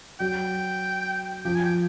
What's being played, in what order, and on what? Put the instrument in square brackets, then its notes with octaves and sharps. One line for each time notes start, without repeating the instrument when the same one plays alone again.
[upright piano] F#3 [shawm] G5
[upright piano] F3 [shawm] G5
[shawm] G#5
G5